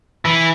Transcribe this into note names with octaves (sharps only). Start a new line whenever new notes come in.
E3